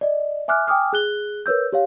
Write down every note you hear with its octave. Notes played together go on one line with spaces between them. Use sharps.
D5 D#5
E5 G#5 D6 F6 F#6
G5 G#5 D6 D#6 F6
G#4 F#6 G7
A#4 B4 C#5 E6 G6
G4 C#5 F5